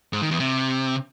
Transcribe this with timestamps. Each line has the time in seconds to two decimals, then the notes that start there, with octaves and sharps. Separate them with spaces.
0.13 G#2
0.22 D#3
0.31 E2
0.40 C3